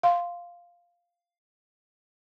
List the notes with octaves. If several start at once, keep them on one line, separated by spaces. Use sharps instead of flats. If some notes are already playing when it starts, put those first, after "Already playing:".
F5 C6